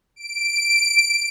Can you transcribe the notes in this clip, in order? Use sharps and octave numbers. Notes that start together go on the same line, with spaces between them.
D7